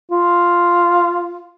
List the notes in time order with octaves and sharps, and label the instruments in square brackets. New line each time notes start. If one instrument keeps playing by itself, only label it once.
[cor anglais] F4